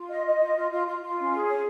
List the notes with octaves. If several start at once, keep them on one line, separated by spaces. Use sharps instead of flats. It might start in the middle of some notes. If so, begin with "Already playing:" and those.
Already playing: F4
D#5
D#5
F4
F4
F4
F4
F4
C#4
G#4
C#5